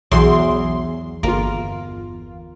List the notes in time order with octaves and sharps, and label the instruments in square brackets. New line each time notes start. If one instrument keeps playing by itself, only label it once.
[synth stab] B1 F#3 C6 [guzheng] E2
[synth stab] G1 F4 [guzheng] A#3